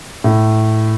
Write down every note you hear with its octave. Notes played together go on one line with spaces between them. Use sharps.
A2